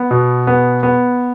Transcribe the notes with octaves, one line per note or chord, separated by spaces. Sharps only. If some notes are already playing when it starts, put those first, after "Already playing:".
Already playing: B3
B2
B3
B3